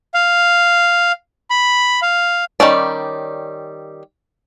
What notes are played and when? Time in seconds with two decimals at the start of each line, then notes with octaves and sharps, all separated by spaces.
0.14 F5
1.50 B5
2.02 F5
2.60 D#3 G3 C#4 D5